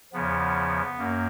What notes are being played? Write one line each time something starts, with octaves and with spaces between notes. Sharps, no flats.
E2 C#3 F3 B3
F#2 A#3